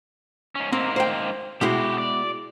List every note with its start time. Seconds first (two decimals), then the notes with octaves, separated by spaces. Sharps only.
0.55 G#2 C#4
0.73 G#2 A#3 C4
0.96 C5 G5
1.61 B2 G#3 E4 F#4 G4
1.98 D5